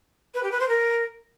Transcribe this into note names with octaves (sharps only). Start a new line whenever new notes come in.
B4
G4
B4
C5
A#4